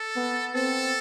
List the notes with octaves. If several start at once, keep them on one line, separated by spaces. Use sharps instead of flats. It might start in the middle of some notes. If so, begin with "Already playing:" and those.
Already playing: A4
B3
C4 A4